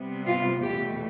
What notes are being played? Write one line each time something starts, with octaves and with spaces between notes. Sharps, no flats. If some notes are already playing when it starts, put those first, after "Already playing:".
Already playing: C3 G3 B3
F4
E2 B2 A3 G4